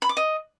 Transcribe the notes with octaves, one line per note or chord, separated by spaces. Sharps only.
B5
D6
D#5